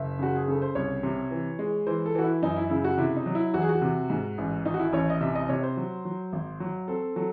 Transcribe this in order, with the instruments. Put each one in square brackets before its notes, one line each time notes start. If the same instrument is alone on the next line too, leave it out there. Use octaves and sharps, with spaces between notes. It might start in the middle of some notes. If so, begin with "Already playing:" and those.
Already playing: [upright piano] F#1 E5
C#3 F#4
G#4
C#3 A4
C5
C2 C#5
C3
E3
G#3
E3 C5
A4
E3 F#4
E4
F#2 D#4
E4
C#3 E4
F#4
C3 E4
D#4
F#3
E4
E2 F#4
G#4
F#4
C3
G#2
A1
D#3 D#4
F#4
E4
A1 C#5
D#5
C3 E5
D#5
C3 C#5
C5
F#3
F#3
G#1
F#3
C4 A4
F#3 A4